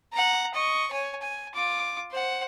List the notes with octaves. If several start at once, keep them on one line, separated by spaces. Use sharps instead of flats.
F#5 A#5
D#5 C#6
C#5 G#5
G#5
F4 D6
C5 F#5